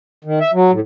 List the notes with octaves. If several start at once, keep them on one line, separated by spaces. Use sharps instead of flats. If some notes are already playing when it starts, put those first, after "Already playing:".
D#3
E5
F#3
A2